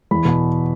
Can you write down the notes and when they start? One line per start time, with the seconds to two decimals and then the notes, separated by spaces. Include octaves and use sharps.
0.11 E2 B5
0.25 B2